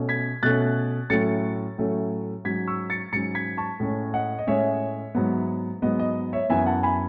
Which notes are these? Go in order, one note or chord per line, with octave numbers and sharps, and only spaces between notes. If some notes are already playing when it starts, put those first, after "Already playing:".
Already playing: B2 A3 C#4
G#6 B6
B2 A3 C#4 F#6 A6
A2 F#3 A3 C#4 A6 C#7
A2 F#3 A3 C#4
G#2 F#3 C#4 G#6 B6
C#6 E6
A6 C#7
G#2 F#3 C#4 A6 C#7
G#6 B6
A5 C#6
A2 G#3 C#4
D#5 F#5
D#5
A2 G#3 C#4 C#5 E5
G#2 F#3 B3
G#2 F#3 B3 D#5
D#5
C#5 E5
F#2 E3 B3 E5 G#5
F#5 A5
G#5 B5